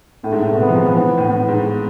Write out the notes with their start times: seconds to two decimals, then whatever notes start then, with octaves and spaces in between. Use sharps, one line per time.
0.24 A2 A3
0.32 G#2
0.42 A2
0.50 B2
0.59 C3 B3
0.69 F3
0.77 G#3
0.86 F3
0.94 E3 B3
1.18 A2
1.30 A2
1.48 G#2